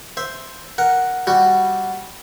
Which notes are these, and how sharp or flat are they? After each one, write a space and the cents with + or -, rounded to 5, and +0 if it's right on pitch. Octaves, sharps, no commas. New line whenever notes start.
C5 +0 E5 +0
A#4 +0 F#5 +0
G3 +0 F#4 +5